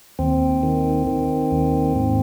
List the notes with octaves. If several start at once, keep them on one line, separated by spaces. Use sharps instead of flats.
D#2 C4
D#3
D#3
D#2
G#2